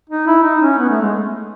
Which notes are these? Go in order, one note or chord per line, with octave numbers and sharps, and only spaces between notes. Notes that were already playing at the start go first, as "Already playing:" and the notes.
D#4
E4
D#4
C#4
B3
A3
G#3